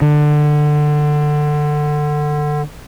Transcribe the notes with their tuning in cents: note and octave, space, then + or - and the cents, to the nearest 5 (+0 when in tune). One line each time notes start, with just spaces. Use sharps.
D3 +20